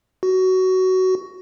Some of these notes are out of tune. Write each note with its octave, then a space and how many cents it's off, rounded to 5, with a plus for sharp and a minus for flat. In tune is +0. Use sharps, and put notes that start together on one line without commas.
F#4 +15